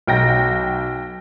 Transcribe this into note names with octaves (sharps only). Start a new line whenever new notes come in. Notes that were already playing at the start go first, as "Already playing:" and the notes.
B1 G5 A#6